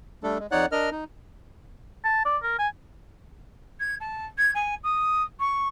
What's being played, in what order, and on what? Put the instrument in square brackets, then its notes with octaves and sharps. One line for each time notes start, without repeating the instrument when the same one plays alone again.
[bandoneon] G3 A3 D4 A4
G#3
F2 D#4 C#5 D5 F#5 F#6
D4 A#4 D#5 F6
D#4
[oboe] A5
D5
A#4
G#5
[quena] G#6
A5
G#6
G#5
D#6
C#6